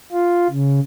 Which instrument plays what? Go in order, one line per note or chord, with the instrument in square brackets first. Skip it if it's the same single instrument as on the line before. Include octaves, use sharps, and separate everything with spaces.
[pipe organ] F4
C#3